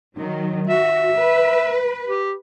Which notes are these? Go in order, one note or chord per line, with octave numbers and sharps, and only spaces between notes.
D#3 F#3
F#4 E5
B4
G4